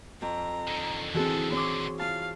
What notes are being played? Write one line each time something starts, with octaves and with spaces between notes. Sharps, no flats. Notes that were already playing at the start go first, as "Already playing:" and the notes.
F2 A#5
D3 D#3
E3 C4 F#4 G#4 A4
C4 C#5 C6 D6
F4 F5 A5